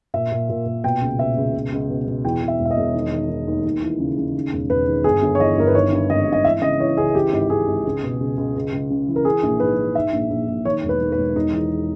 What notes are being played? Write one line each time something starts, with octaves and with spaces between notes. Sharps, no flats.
A#2 E5
A#2
A#2
A#2
B2 G5
C#2
B2 E5
C#2
B2
C#2
B2
B2
E2 G5
E2
E5
E1
E5
D#5
E1
D#3
D#3
D#3
D#2
D#2
E3
C#3
C#3
D#3
E1
E1 B4
D#3
G1 G#4
G1
C#5
E3 D#5
G1 A#4
B4
D#3 C#5
G2
G#1 D#5
G#1
D#5
E3 E5
C#3 D#5
E3 C#5
C#2 G#4
E3 G4
G#1
G#1 G#4
G#1
C#2
B2
C#2
C#2
C#2
C#2
C#3
E3
A#4
E3 G#4
A#1
G#2 B4
E3
G#2 E5
A#1
A#1
A#1
D#3 C#5
E1
B4
D#3
B4
E1
E1 D#4
E2